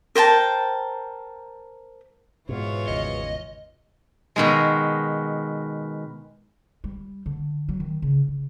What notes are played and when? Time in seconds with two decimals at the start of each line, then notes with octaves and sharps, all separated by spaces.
0.15 A#4 C5 G5 A5
2.49 G#2 B2 E3 F4 C#5
2.88 G#1 E2 C#3 D#5
4.36 B2 D#3 G#3
6.84 G3
7.26 D3
7.69 F#3
7.80 D#3
8.02 C#3
8.28 C#3